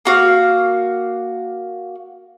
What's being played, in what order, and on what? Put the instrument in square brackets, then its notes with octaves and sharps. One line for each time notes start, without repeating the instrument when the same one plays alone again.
[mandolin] A#3 F#4 F5